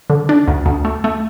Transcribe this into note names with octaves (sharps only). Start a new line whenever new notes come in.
D3
D4
D2
D2
A3
A3